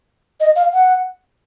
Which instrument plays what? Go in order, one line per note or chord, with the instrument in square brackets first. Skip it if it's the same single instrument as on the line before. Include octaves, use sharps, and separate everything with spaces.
[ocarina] D#5
F5
F#5